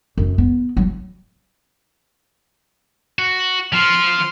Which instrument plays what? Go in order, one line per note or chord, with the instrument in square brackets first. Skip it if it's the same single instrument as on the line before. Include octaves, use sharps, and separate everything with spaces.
[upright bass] F#2
B3
F#3
[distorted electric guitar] F#4
[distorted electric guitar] F3 [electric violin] C6 F6